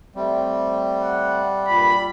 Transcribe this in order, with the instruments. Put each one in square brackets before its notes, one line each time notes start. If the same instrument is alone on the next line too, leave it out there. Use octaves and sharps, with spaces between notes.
[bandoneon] G3 [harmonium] A3 C4
[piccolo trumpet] F#5
[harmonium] G2 A#2 [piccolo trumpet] B5